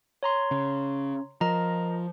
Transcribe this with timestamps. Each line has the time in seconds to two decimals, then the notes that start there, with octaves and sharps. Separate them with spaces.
0.23 C#5 A#5 C6
0.51 C#3
1.41 F3 A#4 D#5 A#5